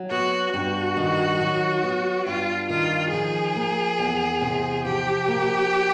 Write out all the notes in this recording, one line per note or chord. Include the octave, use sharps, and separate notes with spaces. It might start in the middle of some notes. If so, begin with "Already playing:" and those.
Already playing: F#3
B3 F#4
G2 F#4
D#3
F#3
B3
G2 F4
D#3 F4
F3 G#4
A#3
E2
C3
F3 G4
A#3